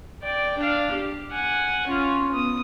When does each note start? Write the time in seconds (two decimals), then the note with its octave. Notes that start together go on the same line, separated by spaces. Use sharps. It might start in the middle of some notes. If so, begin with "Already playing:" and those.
0.23 D5 G5
0.58 D4 F5
0.91 G4
1.31 F#5 G#5
1.87 C#4 F4
2.32 B3 D#6